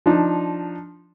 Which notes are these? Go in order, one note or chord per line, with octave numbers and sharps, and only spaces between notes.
F3 D4 D#4